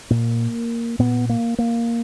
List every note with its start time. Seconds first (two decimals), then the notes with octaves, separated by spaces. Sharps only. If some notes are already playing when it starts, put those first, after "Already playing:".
0.10 A#2 A#3
0.99 A#2 B3
1.29 A#3
1.59 A#3